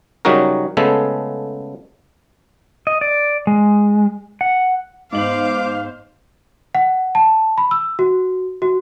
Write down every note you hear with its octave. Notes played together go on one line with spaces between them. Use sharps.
C#3 F#3 G3 D#4 F#4 A#4
C#3 G#3 A3 B3 A4
D#5
D5
G#3
F#5
G#2 B3 C5 F5 D6 F#7
F#5
A5
B5
E6
F#4
F#4